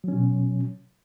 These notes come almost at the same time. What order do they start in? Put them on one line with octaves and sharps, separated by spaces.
F#3 C#4 B2